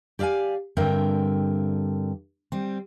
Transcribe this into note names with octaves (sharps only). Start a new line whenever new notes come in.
G4 D5 E5 F5 G#5
G2 D3 C4 A#4 E5 G5
G3 C4